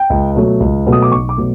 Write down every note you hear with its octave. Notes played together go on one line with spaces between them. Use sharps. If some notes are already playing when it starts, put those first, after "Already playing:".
Already playing: G5
C#2
B2 F#3 A3
C#2
B2 F#3 A3
D#6
D6
B1 C#6
D6
B2 F#3 A3